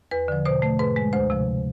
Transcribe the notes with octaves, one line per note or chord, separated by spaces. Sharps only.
E2 B4
D3 F3
B2 C5
A3
G#2 B4
G#3
D2 C5
C3 F3